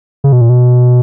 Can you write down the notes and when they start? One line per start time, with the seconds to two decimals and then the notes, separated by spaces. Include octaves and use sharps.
0.24 C#3
0.33 B2
0.41 A#2
0.50 B2